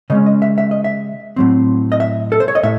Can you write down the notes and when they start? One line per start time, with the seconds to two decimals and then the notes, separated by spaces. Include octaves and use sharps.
0.10 C#3 G#3 C#4 D#5
0.26 D#5
0.42 E5
0.58 E5
0.71 D#5
0.84 E5
1.36 A2 F#3 C4
1.92 D#5
2.00 E5
2.32 A4
2.40 C5
2.48 C#5
2.55 D#5
2.63 A2 E5